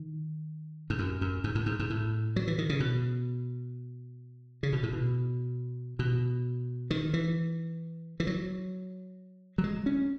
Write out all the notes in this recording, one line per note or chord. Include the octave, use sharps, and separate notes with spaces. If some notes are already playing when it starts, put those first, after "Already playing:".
Already playing: D#3
G#2
F#2
F#2
G#2
A2
G#2
G#2
A2
F#3
E3
D#3
C#3
B2
C#3
B2
A2
B2
B2
D#3
E3
E3
F#3
F#3
G#3
C#4